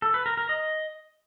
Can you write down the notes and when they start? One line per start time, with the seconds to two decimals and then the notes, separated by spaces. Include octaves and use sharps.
0.02 A4
0.14 B4
0.26 A#4
0.37 A#4
0.49 D#5